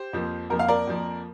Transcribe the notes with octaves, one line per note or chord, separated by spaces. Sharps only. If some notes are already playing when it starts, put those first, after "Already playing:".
Already playing: G4 C5
F2 F3 A#3
F2 F3 A#3 A#4
F5
A#4 D5
F2 F3 A#3